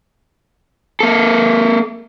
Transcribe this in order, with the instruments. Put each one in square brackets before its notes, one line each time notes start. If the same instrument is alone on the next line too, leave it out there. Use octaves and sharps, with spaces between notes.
[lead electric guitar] A#3 A4